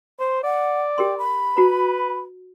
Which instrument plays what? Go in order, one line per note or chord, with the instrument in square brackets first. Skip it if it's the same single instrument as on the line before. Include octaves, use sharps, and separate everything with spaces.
[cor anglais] C5 [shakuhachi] C6
[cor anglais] D5 [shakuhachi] F#5
[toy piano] G4 A#4 C6 [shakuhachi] G5
[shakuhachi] B5
[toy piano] F#4 A#5 [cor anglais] B4